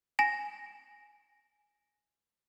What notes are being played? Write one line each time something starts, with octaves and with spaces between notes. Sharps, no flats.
G#5 A#6 E7